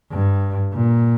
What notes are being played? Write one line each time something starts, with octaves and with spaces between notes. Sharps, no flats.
G2
A#2